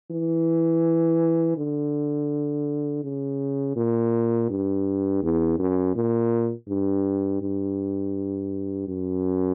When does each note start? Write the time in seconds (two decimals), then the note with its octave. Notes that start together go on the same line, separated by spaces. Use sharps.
0.11 E3
1.57 D3
3.04 C#3
3.76 A#2
4.50 G2
5.23 E2
5.59 F#2
5.96 A#2
6.69 G2
7.42 G2
8.88 F#2